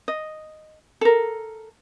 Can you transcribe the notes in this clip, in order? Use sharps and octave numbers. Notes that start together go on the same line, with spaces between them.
D#5
A4 A#4